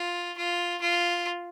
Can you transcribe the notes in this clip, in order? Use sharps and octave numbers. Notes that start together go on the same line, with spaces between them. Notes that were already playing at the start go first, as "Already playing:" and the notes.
Already playing: F4
F4
F4